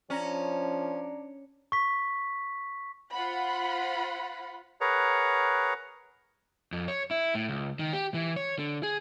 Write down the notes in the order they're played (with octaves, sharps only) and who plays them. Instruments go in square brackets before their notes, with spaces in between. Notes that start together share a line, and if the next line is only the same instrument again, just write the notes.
[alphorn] F3 [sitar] C#4 [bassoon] D4 [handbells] C#5 A#5 A#6
[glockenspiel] C#6 B6
[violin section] F4 C5 F#5 B5
[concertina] G#4 A#4 B4 C#5 F#5 A#5
[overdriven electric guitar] F2
C#5
E4
A2
C#2
D#3
G4
E3
C#5
D3
G#4